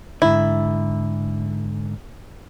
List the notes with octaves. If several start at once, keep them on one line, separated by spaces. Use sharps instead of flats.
G#2 D3 E4